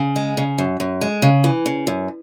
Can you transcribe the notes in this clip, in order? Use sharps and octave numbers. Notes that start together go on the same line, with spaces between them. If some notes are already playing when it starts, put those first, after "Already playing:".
Already playing: C#3
G#3
C#3
F#2
F#2
G#3
C#3
E3
C#3
F#2